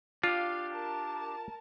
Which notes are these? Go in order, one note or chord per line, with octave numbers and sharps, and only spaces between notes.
D4 F4 G4 F5
A#4 A5